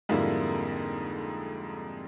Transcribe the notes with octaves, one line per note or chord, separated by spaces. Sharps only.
F2 G#2 D3 G3 A#3 E4